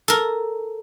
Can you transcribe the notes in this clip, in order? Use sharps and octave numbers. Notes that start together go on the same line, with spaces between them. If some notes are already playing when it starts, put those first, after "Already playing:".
A4 A#4